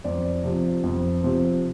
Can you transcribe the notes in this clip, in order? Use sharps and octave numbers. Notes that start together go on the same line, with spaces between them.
F2 D5
C3 F3
F2
C3 F3